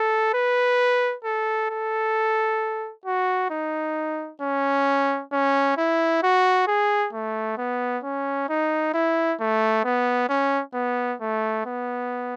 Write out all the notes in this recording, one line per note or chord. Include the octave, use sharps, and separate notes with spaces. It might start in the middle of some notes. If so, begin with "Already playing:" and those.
Already playing: A4
B4
A4
A4
F#4
D#4
C#4
C#4
E4
F#4
G#4
A3
B3
C#4
D#4
E4
A3
B3
C#4
B3
A3
B3